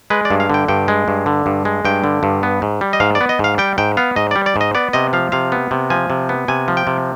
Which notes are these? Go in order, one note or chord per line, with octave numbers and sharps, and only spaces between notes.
G#3 B4
D5
G2
F5
D3 G5
G2 G5
G#3
G2
D3
G2
G#3
G2 G5
D3
G2
B3
G#2
G3
D#5
G#2 F5
D5
B3
D#5
G#2 F5
G3 G5
G#2 G5
B3 F5
G#2 D#5
G3 D5
D5
G#2
D#5
B3 D5
C3 D#5
F3 F5
C3 F5
B3
C3
F3 G#5
C3
B3
C3 G#5
F3
G5
C3